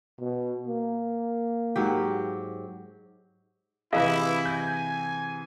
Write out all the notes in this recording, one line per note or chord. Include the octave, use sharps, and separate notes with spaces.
B2
A#3
G#2 F#3 G4
C3 E3 E4 G#4 B4 D#5 F5
G#5 G6 A#6